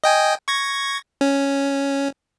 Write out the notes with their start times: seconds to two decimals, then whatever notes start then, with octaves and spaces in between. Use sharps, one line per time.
0.04 D#5 G5 G#5
0.48 C#6 G#6 A#6
1.21 C#4